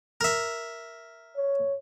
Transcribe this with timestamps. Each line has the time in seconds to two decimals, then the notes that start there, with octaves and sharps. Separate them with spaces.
0.21 A#4 E5
1.36 C#5